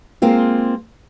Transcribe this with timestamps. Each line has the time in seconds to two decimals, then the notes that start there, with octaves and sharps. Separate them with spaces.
0.22 G#3 A#3 C4 F4